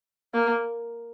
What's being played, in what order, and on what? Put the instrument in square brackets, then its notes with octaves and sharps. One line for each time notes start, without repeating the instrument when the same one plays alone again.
[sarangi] A#3